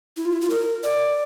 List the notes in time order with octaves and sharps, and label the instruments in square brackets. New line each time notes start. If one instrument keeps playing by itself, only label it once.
[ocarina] E4
F4
E4
F4
A#4
D5